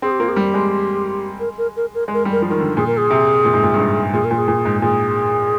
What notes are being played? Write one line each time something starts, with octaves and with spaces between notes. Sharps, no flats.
C4 G#4
G4
A#3 F4
G#4
G3 G4
G#3
A#4
A#4
A#4
A#4
G#3
A#4
G3
A#4
F3
D#3 A#4
D3
A#2 G#4
A#4
G#4
C3
A#2
G#2
A#2
G2
G#2
A#2 G#4
A#4
A#2
G#4
A#2
G#2
A#2 G#4